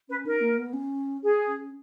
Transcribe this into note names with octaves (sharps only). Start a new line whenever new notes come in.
C#4 B4
D#4 A#4
A#3
B3
C#4
G#4
C#4